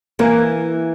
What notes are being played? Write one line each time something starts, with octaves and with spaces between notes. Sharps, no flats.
E3 A#3